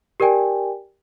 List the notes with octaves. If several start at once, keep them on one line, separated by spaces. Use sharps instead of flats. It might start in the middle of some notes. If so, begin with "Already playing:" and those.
G4 A#4 D5 G5 G#5